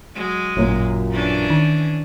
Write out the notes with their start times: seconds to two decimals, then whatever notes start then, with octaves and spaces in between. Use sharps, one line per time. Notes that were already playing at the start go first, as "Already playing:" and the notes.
0.15 F#3 G#3
0.57 A1 F#2 A#2
1.11 E3 C#4 D4
1.50 D#3